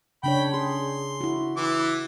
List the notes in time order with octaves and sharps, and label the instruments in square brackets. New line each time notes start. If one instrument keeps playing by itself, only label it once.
[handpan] C#3 D4 C#5 [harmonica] G5 B5
[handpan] G#4 [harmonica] C6
[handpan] E4 F#4
[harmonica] E3 D6